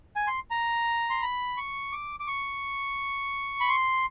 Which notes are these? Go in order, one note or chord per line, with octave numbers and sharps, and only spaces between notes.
G#5
C6
A#5
C6
B5
C#6
D6
D6
C#6
B5
C6